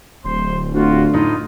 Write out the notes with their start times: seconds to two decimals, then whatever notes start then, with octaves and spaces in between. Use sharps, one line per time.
0.25 D1 C5 C6
0.74 D2 F4 F#4
1.14 A2 D#4 F4 D#5